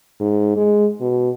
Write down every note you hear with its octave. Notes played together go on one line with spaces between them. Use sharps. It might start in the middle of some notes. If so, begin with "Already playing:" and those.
G#2
G#3
B2